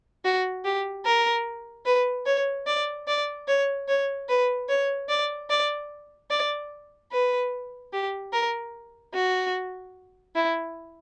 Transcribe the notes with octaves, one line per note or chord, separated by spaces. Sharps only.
F#4
G4
A#4
B4
C#5
D5
D5
C#5
C#5
B4
C#5
D5
D5
D5
B4
G4
A#4
F#4
E4